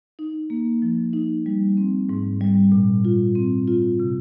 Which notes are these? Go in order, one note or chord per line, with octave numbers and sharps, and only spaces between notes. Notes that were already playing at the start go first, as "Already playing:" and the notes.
D#4
A#3
F3
D#4
G3
C4
G#2
G3
A#2
F4
C4
F4
C3